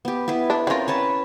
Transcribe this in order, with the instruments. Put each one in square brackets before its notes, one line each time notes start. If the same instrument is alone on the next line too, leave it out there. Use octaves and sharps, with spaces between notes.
[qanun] B3 G4
B3 E4 B4
[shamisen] D4
[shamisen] C4 F4 [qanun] C#4 A#4
[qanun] B4 C#5 A5